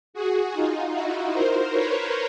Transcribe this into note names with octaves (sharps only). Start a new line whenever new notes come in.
F#4 G#4
D#4 F4
E4 F#4
A#4 C5
B4 C#5